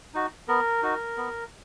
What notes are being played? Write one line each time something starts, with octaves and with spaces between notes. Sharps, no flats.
D#4 F#4
B3 A#4
D#4 F#4
B3